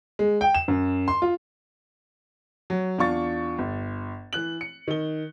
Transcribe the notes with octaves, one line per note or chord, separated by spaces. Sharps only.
G#3
G5
E7
F#2
C6
F4
F#3
E2 D4 F4 C#6 A6
G1
E3 F#6 F#7
C#7
D#3 G7